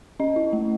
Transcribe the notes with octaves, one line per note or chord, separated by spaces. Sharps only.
C#4 D#5
E4
A3